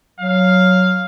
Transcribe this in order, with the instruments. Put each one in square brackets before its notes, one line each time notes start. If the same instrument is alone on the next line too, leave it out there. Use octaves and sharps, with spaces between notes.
[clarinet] F#3 [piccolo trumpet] F5